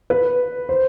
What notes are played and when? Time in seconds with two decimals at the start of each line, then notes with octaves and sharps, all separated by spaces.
0.10 B4
0.69 C5